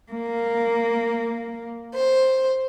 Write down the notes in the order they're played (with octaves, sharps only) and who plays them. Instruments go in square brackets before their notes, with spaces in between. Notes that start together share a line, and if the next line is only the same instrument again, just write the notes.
[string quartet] A#3
C5